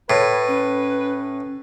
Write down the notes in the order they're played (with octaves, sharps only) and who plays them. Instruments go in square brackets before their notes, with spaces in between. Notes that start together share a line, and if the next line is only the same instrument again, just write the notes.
[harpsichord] A2 [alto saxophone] B4 [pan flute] C#5
[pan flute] C#4